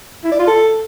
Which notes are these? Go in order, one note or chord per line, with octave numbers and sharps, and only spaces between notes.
E4
D5
F4
A4